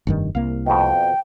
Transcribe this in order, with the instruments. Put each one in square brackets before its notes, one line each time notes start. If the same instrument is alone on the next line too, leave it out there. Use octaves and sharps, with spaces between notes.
[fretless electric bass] F1 G2 D#3
[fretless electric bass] C2 A#3 [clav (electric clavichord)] F5
[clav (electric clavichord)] F2 B2 [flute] G5